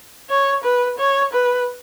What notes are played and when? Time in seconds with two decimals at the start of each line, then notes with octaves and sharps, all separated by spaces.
0.30 C#5
0.64 B4
0.98 C#5
1.33 B4